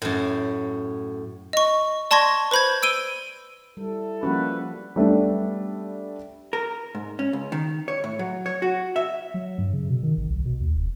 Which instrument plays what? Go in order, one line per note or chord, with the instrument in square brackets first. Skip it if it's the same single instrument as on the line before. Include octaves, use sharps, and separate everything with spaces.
[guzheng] F#2 A2
[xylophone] D#5 C#6
D5 A5 C6 C#6 G#6 A#6
B4 C5 B5 G6 G#6
E6 D7 D#7 G7
[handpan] G3 [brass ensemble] E4 A4
[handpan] F3 G3 F#4 [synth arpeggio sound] A#3 C#4 [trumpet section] B4
[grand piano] G3 A3 B3 D4
[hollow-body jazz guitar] A#4
G#2
C#4
C#2
D#3
C#5
A2
F#3
C#5
F#4
E5
[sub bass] F#3
G2
C#3
B2
D#3
G#1
C2
B2
D#2
E1